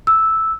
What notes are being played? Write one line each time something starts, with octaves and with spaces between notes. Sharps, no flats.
E6